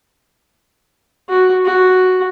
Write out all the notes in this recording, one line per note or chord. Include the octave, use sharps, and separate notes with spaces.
F#4
F#4